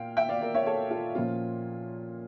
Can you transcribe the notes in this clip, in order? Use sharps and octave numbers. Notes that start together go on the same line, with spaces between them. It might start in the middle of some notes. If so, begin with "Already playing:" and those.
Already playing: A#2 F5 G5
E5 G5
D5 F5
A#4 D5
C#5 E5
A4 C#5
F4 A4
A#2 F3 A#3 C#4 F4